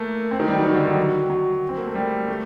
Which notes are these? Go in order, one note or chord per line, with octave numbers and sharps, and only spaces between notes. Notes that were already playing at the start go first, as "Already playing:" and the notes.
Already playing: A3 A#3
C4
D#3
G3
F#3
D#3
D3
D#3
F#3
F#3
C4
A#3
A3
G3
A3